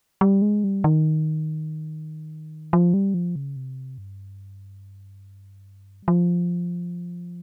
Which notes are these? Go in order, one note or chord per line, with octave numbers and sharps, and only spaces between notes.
G3
G#3
G3
D#3
F3
G3
F3
C#3
C3
G2
G3
F3